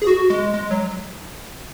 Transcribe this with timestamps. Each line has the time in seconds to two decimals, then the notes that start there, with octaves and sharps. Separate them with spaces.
0.02 G#4
0.07 F#4
0.30 G#3
0.54 G#3
0.71 F#3